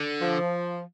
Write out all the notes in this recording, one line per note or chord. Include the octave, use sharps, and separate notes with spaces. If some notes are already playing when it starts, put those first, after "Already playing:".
Already playing: D3
F3